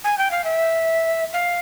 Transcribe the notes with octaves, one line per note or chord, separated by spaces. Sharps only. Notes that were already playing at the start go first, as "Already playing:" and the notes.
G#5
G5
F5
E5
F5